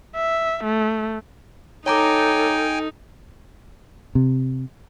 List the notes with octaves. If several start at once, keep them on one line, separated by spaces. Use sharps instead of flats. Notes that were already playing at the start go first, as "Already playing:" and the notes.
E5
A3
D#4 A4 C#5 G5 G#5 A#5 D6
C3